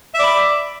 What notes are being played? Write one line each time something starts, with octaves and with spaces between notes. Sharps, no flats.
D5 E5 B5